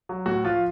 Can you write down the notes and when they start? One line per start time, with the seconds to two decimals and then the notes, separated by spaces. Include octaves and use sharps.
0.09 F#3
0.26 A2 F#4
0.44 F3 F4